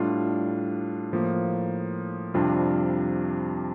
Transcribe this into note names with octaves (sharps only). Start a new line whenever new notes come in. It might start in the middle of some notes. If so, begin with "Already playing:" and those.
Already playing: A2 G3 D4 F4
A2 F3 A#3
F2 C3 G3 D4 F4